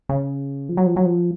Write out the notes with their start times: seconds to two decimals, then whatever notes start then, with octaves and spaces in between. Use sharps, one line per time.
0.09 C#3
0.69 F3
0.77 F#3
0.86 F3
0.96 F#3
1.05 F3